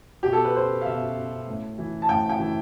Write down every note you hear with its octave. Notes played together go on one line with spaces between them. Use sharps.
B2 G4
A4
B4
C5
F5
B2 E5
A2
E3
A5
A2 G5
G5
E3